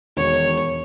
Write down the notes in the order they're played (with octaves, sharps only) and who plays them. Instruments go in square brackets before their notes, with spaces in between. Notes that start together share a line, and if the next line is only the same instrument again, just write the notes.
[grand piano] E1 D#3 [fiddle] C#5